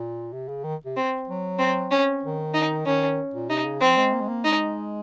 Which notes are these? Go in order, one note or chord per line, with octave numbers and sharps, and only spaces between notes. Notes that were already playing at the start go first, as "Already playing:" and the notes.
Already playing: A#2
C3
C#3
D#3
C3
C4
F#3
C4
C#4
D#3
D#4
D#3 C#4
A#2
C3 D#4
C#3
F3 C4
G#3
A#3
G#3
A#3
G#3 D#4